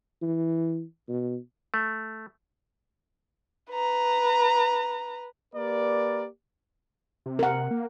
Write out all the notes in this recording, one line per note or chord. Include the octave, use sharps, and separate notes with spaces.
E3
B2
A3
B4 A#5
A#3 G4 A#4 B4 D5
C3
A#4 F#5
A#3